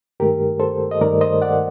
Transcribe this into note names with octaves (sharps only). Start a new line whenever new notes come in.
G2 D#3 A3 G4 A#4
A4 C5
D#5
G2 D#3 A3 A#4 D5
C5 D#5
D5 F#5